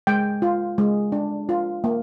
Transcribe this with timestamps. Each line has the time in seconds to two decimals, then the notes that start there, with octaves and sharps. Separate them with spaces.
0.07 G#3 G5
0.42 F4
0.78 G#3
1.12 D4
1.49 F4
1.84 A#3